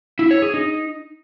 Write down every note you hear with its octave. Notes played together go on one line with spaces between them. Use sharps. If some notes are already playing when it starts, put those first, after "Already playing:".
E4
C#5
G#4
D#4